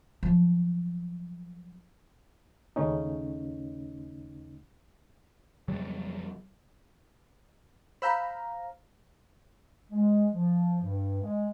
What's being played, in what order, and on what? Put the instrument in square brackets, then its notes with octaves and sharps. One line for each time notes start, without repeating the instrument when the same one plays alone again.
[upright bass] F3 F#3
[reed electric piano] D#2 C#3 A3 C#4 D#4
[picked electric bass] F2 C#3 F#3 G3
[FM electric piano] C5 F5 A#5 [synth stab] B5 E6 G6
[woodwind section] G#3
F3
G2
G#3